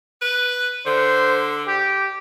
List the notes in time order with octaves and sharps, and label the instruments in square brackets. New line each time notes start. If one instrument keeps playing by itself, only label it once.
[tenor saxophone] B4
[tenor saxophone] D3 [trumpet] C5
[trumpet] G4